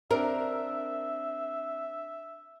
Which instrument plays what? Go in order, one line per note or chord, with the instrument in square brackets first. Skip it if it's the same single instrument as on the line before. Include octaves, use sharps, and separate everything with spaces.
[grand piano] C4 D4 [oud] A#4 [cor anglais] E5